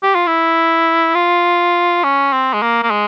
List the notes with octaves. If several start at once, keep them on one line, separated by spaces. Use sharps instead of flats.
G4
F4
E4
F4
C#4
C4
G#3
A#3
A#3
G#3